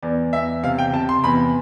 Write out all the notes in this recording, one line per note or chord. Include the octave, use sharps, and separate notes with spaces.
E2 D5
E2 E5
C3 F5
G5
C3 A5
C6
E2 B5